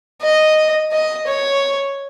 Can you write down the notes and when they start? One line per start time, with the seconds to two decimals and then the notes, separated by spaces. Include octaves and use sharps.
0.21 D#5
0.91 D#5
1.27 C#5